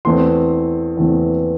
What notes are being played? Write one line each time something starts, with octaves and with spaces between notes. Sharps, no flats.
E2 E3 A3 C4 C6
E2 E3 A3 C4